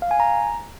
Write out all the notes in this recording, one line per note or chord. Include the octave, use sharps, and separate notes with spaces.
F5
G#5
A#5